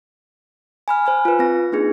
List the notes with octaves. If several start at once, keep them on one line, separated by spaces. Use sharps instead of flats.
G#5 B5 F6
C5 G#5 B5
F4 B4
C4 A#6
A#3 C4 D4 D#4 G#4